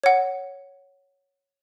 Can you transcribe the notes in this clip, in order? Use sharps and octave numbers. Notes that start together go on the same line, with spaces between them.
C#5 F#5